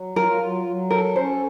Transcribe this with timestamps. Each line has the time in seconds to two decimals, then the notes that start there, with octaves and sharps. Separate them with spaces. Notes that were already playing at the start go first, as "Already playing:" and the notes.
Already playing: F#3
0.16 F4 A#4
0.41 F#3
0.67 F#3
0.91 A4 A#4
1.16 C#4 C5